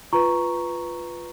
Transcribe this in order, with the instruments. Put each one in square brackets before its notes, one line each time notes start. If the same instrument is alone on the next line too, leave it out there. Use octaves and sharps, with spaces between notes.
[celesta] F4 B4 A#5 C#6